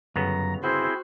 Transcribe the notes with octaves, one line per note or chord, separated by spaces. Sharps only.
G1 F#2 C#3 B3 A#5
C4 E4 F#4 G#4 C5